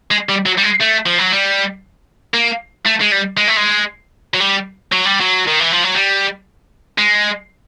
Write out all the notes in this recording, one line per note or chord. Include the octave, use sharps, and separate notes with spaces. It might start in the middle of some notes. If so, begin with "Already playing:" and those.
G#3
G3
F#3
G3
G#3
A3
F3
F#3
G3
A#3
A3
G#3
G3
G#3
A3
G#3
F#3
G3
F#3
G3
F#3
D#3
E3
F3
F#3
G3
G#3